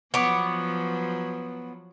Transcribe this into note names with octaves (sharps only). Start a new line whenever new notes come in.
F3 F#3 B3 C#5 D6